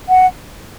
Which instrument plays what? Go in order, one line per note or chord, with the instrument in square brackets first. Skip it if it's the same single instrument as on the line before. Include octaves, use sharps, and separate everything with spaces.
[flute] F#5